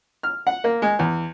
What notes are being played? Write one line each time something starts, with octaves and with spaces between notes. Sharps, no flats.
F6
F#5
A#3
G#3
E2